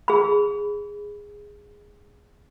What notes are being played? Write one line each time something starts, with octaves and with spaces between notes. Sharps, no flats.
G#4 B5